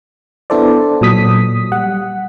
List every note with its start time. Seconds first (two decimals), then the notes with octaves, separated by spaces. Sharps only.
0.50 B3 D4 E4 A4 C5 D5
1.01 A#2 F#3 D#6 B6
1.72 G3 F#5